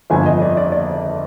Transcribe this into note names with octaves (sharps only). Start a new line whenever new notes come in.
G1 F2 D3 G#5
D#5
D5
D5
D5